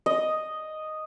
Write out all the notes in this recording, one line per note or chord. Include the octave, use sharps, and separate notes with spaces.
D#5